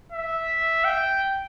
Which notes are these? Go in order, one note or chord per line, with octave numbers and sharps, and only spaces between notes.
E5
G5